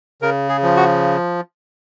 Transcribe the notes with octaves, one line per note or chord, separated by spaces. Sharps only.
C#3 A#4
G#4
F3
F#4